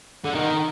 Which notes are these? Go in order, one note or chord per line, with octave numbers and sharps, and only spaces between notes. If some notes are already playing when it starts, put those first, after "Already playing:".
D3
D#3